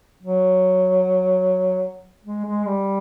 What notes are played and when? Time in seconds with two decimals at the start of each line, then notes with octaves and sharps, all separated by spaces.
0.23 F#3
2.25 G#3
2.45 G#3
2.66 G3